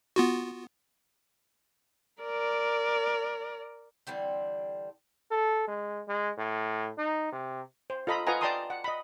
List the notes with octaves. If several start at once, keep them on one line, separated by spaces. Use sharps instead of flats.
B3 F4 F#4
A#4 D5
D3 E3 G3 C4
A4
G#3
G#3
A2
D#4
C3
C5
F4 A4 D#5 A#5 B5
F4 B4 D#5 F#5 G#5 A#5
D5 G5 A5 A#5 C6 D#6
F#5
D#5 B5